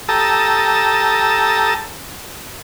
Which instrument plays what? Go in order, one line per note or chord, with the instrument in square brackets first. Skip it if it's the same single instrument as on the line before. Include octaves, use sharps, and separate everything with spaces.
[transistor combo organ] G4 A4 A5 A#5 D#6 E6